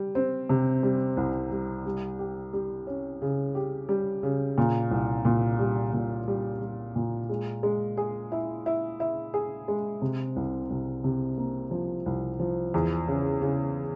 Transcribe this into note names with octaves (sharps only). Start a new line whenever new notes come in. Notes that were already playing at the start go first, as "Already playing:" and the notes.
Already playing: G3
C4
C3
G3
C2
G3
G3
G4
G3
C#4
C#3
G4
G3
C#3
A#2
C2
A#2
G3
A#2
G3
G3
A#2
G#3
G#3
G#4
E4
E4
E4
G#4
G#3
C3
C2
C2
C3
A#3
F3
C2
F3
E2
C#3
C#3